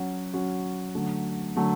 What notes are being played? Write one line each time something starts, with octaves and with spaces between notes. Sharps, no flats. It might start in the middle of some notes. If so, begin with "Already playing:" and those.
Already playing: F#3 C#4 F#4
F#3 C#4 F#4
D3 F#3 A3
D3 F#3 A3